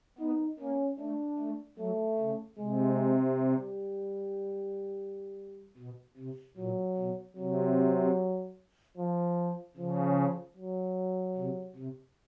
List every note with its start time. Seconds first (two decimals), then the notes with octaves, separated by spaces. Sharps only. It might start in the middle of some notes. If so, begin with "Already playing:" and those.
0.19 B3 D#4
0.59 A#3 C#4
0.99 A3 D4
1.38 A3
1.78 F#3 A3
2.19 C#3
2.58 C3 G#3
3.38 G3
5.78 B2
6.17 C3
6.57 A#2 F#3
6.97 B2
7.37 C3 F#3
8.97 F3
9.77 C#3 F3
10.57 F#3
11.37 C3
11.76 C3